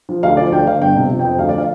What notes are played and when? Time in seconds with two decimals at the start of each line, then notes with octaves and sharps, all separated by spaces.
0.09 F3
0.23 D2 F5
0.37 F3 D5
0.52 D2 G5
0.67 D3 F5
0.81 G1 G5
0.96 C3
1.10 F3
1.19 G5
1.24 F2
1.39 D2 F5
1.49 D5
1.53 F3 F5